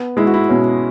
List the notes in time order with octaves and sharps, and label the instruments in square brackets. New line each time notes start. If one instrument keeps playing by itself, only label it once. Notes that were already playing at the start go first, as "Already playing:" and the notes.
Already playing: [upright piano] B3
[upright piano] G#3 [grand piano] E4
[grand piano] F#4
E4
[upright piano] B2 [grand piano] C#4